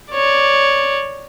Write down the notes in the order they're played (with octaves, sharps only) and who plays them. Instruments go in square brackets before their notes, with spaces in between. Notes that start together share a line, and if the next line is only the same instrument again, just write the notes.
[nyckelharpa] C#5 D5